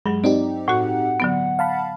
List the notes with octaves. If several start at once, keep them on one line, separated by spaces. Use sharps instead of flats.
G2 F#3 G#3
C4 D#4 G4 D5
A2 F#4 F#5
D3 F#3 B3
F5 A5 B5